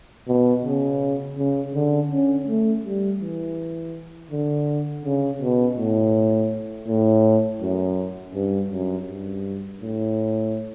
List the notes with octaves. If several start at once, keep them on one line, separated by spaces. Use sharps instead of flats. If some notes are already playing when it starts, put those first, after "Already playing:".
B2
C#3
C#3
D3
C#4
A3
G3
E3
D3
C#3
B2
A2
A2
F#2
G2
F#2
G2
A2